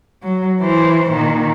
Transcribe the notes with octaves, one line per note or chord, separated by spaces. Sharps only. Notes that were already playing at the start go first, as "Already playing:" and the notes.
F#3
E3 C5
A#2 D#3